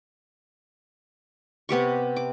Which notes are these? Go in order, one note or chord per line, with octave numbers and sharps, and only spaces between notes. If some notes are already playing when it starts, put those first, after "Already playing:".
C3 B3 G4 C#6
D6